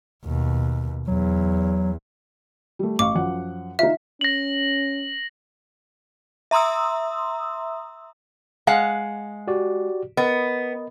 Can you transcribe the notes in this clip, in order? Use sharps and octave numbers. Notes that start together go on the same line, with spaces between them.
D#2 B2
E2 F#3
G3 A3
A1 F5 C#6 D6
F#2 F3 F#5
D#4 F4 E5
C#4 A#6 F#7
E5 A#5 C6 D#6 E6
G#3 F5 F#5
F#4 G4 D5
B3 A#4 D#5